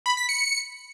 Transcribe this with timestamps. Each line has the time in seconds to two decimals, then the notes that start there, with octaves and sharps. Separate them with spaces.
0.06 B5
0.17 B6
0.29 C#7